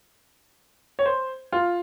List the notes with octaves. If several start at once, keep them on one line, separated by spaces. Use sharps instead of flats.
C#5
C5
F4